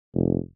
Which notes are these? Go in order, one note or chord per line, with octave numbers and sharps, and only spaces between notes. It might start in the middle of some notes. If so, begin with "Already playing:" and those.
F1